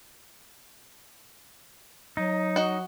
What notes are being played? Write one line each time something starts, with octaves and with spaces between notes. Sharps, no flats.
F#3 D#4
F#4 D#5